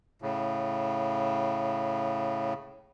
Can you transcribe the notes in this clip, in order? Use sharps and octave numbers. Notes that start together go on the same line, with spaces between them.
A2 C#3